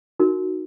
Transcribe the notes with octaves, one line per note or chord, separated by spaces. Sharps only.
D#4 F#4 A#4